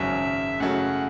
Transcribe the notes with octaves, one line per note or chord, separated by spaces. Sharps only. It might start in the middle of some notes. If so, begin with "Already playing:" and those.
Already playing: G#1 F#2 C#3 F#3 C#4 E5
F#2 C#3 F#3 A3 E4 F#5